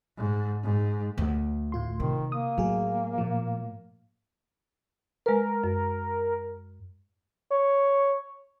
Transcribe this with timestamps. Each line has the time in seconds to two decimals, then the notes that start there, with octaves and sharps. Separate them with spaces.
0.18 G#2
0.64 G#2
1.18 D2
1.72 A2 F4 C6
2.00 C3 D#3
2.32 A#3 D#6
2.58 A2 F#3 G#4
3.18 A#2 F3
5.26 G#3 A#4 B4
5.64 F#2
7.52 C#5